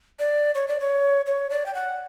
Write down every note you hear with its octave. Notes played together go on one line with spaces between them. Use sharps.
D5
C#5
D5
C#5
C#5
D5
G5
F#5